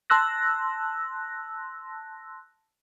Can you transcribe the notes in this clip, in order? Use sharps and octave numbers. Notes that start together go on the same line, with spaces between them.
A5 C6 E6 F#6 A#6